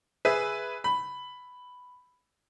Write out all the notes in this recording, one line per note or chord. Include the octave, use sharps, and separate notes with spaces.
G#4 B4 E5
B5